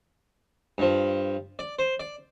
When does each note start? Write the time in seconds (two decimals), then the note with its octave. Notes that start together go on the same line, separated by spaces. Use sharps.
0.78 G2 F3
1.59 D5
1.79 C5
2.00 D5